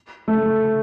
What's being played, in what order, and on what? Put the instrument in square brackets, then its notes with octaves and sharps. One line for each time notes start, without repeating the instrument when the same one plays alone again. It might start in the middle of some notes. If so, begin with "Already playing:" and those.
[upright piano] A3